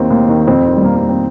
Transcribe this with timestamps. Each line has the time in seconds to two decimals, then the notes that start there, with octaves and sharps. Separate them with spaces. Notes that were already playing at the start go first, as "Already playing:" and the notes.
Already playing: D#2 D#3 C4
0.10 D#2
0.29 D#3
0.47 F2 C4
0.66 D#3
0.77 G3
0.84 F2 A#3
0.96 A#3
1.03 D#3
1.09 C4